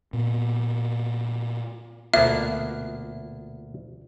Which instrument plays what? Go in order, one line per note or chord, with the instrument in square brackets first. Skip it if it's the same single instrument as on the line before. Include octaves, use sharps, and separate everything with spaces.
[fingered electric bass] A#2 B3
[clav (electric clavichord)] D2 A#3 B3 [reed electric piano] B2 F4 [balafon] E5